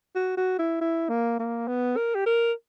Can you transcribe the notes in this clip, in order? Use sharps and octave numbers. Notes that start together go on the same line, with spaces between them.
F#4
F#4
E4
E4
A#3
A#3
B3
A#4
G4
A#4